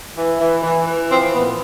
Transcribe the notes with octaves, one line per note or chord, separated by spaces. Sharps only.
E3
E3
E3
E3
F3 C4
A#2 B3